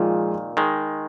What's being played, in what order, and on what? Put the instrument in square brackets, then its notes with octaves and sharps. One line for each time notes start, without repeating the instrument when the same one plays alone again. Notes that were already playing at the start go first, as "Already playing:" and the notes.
Already playing: [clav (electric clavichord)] A#2 D#3 [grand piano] F3 G#3 F4 G#4
[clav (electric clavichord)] D#3 G#3